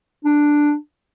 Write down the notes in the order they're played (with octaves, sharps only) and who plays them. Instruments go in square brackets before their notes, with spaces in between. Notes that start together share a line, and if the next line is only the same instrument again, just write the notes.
[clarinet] D4